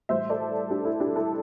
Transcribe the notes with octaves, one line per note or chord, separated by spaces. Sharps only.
A2 E3 G3 C5 E5
A4 D5
D4 G4
E4 A4
D4 G4
E4 A4